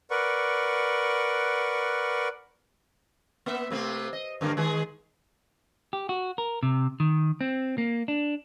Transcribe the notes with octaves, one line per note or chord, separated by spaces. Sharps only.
A#4 B4 D5 F#5 C#6
A#3 B3 E5
C3 A3 C4
D#5
G2 D3 A#3
D#3 G#3 G#4
G4
F#4
A#4
C3
D#3
C4
A#3
D4